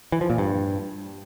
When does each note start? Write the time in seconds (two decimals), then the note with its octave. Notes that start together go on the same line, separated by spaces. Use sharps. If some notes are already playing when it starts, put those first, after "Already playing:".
0.12 E3
0.21 F3
0.30 A#2
0.38 G2